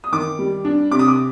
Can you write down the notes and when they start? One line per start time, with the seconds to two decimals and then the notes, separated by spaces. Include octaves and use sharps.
0.04 D#6
0.13 D#3 D6
0.39 G3
0.65 D4
0.91 C3 D6
0.99 D#6
1.08 D6